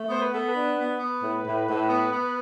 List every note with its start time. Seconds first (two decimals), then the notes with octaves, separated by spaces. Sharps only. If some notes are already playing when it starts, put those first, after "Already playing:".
Already playing: A3
0.08 B3 C5
0.21 B4
0.32 B3 A4
0.46 B4
0.54 D4
0.76 B3
0.99 B3
1.22 A2
1.45 A2
1.67 A2
1.89 B3
2.13 B3